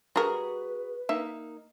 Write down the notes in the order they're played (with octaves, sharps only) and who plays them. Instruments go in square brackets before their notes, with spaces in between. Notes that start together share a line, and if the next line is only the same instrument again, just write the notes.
[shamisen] G3 A#4 [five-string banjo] F#4 G#4 F#5 [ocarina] B4
[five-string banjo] A#3 D#4 [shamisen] E5